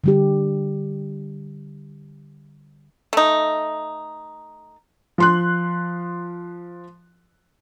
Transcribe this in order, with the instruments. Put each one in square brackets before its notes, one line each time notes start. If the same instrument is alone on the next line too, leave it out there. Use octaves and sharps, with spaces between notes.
[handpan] D3 G3 G4
[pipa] A3 D#4
[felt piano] F3 C6 F#6